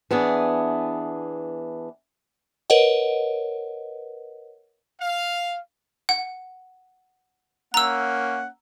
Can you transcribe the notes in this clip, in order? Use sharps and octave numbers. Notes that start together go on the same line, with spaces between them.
E3 B3 D4 G#4
A#4 B4 C#5 D#5 F#5
F5
F#5
A#3 C#4 F#5 A#5 E6